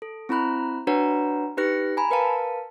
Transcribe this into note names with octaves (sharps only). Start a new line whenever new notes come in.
A4
C4 E4 A#5 B5 F#6
D4 F#4 B4 C#5 F#5 A#5
D#4 G4 B4 F#6 A#6 C#7
G#5 A#5 B5
A#4 B4 F5 A5